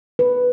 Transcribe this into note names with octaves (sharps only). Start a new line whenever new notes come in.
B4